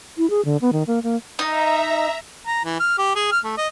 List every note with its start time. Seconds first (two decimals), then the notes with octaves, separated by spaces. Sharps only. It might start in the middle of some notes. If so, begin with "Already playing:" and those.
0.18 E4
0.30 G#4
0.45 D3
0.61 B3
0.73 D#3
0.87 A#3
1.03 A#3
1.39 D#4 E5 A#5
2.47 A#5
2.65 E3
2.80 F6
2.98 G4
3.16 G#4
3.32 F6
3.44 A3
3.58 D#5